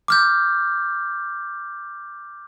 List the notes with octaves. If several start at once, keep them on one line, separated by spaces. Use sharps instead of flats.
D6 F6 G6